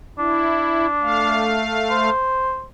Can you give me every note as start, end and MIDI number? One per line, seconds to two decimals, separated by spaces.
0.19 1.56 62
0.19 0.86 64
1.02 2.10 57
1.02 2.10 77
1.91 2.64 72